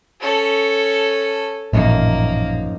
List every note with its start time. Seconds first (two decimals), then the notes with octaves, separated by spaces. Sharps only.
0.21 C#4 A4
1.73 A1 F#2 A#2 F3 A#3 D#4